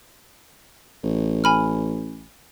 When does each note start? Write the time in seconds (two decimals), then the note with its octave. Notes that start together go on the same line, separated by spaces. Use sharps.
1.03 A1
1.44 G#5 B5 F6